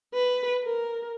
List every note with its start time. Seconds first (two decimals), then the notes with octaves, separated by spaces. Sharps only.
0.14 B4
0.64 A#4